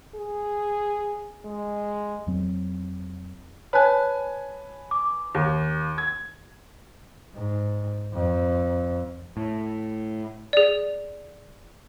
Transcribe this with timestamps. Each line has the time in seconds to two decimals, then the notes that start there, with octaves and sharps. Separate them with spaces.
0.15 G#4
1.45 G#3
2.27 F2 F#3 C4
3.73 B4 C#5 G#5 A5 F#6
4.91 D6
5.35 D#2
5.98 G#6
7.35 G#2
8.13 F2
9.37 A2
10.53 G#4 D5